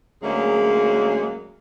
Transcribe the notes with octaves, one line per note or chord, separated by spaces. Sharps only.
D2 F#3 G#3 A#3 C#4 G#4